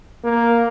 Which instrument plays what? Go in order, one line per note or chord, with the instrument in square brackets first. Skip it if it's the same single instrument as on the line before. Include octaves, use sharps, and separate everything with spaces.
[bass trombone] A#3